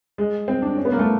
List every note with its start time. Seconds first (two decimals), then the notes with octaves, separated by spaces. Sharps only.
0.18 G#3
0.48 C4
0.62 D4
0.77 C#4
0.85 B3
0.92 A#3
0.99 A3